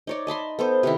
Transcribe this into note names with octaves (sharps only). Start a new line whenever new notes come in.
D#4 C#5 D5
D#5 A5 B5 C6
B3 A4 C5
C3 D#3 E4